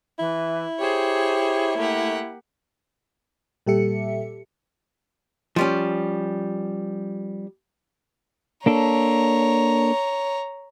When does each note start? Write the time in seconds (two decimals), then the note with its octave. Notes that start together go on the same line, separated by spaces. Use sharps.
0.19 E3 E4
0.78 G4 G#4 C5 C#5
1.76 A3 A#3 G4 F#5
3.67 A#2 G3 G4 A4 E5 C#7
5.56 F3 G3 C#4
8.66 A#3 D4 A4 C#5 A#5